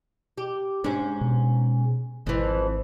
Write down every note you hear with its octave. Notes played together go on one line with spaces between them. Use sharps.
G4
G#2 C#4 D4
B2
G#1 F2 E3